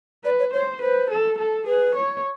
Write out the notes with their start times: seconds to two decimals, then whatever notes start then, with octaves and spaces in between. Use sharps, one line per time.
0.25 B4 D5
0.39 C#5
0.53 C5 C#5
0.82 B4 C5
1.11 A4
1.38 A4
1.66 G#4 B4
1.95 C#5